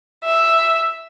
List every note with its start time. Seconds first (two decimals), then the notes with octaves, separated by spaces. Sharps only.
0.24 E5